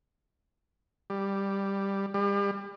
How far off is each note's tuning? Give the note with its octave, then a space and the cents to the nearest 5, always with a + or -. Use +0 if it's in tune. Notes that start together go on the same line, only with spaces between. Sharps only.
G3 +5
G3 +35